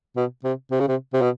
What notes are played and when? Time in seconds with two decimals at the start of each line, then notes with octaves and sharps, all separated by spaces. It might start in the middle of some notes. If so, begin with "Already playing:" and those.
0.16 B2
0.44 C3
0.71 C3
0.80 C#3
0.88 C3
1.13 C3
1.21 B2